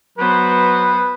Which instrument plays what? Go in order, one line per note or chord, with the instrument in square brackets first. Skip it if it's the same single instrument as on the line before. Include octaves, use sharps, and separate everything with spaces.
[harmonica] F#3 B4 [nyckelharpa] B3 C5